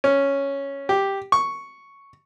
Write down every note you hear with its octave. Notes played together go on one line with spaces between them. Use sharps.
C#4
G4
C#6